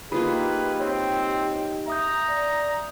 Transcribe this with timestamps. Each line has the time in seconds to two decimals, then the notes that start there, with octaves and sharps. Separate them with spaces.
0.12 A#3 D#4 F4 G4 G#4 B4 B5
0.80 C4 C#5
1.87 E5 A#5 D#6 G6
2.29 D5